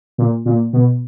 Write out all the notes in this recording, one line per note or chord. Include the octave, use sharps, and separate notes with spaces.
A#2
A#2
B2